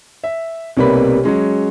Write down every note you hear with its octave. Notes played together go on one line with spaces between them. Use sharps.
E5
B1 C3 G3 A#3 B4 B5
F#3 G#3 C#4